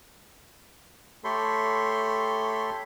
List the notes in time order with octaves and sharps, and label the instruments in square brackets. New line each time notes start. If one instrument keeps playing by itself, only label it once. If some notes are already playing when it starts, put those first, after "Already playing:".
[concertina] A3 G4 A4 C#5 B5 C6